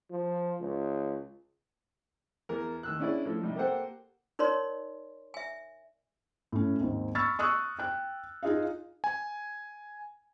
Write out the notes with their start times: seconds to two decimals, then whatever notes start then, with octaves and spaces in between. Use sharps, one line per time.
0.10 F3
0.60 C#2
2.49 E2 A#4
2.83 D#2 E6 F#6
3.00 C#4 D4 E4 G#4 D5
3.25 A2 F3 A4
3.41 C3 G3 D#4
3.56 A#3 G4 A4 C5 F#5 G5
4.39 D#4 A#4 C#5 D5 C6
5.34 E5 G#5
6.52 A2 C#4
6.80 D#2 G#2 C4
7.15 B5 C#6 E6 F6 A6
7.39 C#6 D#6 E6 F#6
7.79 G5 F#6
8.43 D#4 F4 G#4 D#5 F5
9.04 G#5